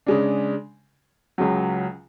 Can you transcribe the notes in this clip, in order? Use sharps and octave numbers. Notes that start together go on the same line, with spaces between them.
C#3 G#3 D4
C#2 C#3 F#3